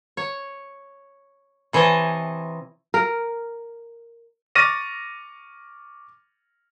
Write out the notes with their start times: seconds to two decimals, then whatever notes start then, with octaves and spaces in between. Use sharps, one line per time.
0.17 C#5
1.73 C3 E3 C#5 D#5 G#5 A5
2.94 A#4
4.55 C#6 D6 F6 A6 A#6 D#7